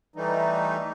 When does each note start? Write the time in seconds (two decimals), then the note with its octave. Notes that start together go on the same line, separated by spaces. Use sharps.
0.16 E3 G3 A3 D#4